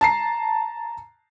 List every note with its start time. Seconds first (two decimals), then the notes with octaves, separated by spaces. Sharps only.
0.01 A5 A#5 C7